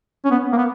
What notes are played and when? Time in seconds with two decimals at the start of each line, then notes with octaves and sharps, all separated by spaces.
0.25 C#4
0.31 B3
0.53 A#3
0.57 B3